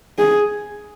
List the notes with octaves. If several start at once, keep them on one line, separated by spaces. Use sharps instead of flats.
G#4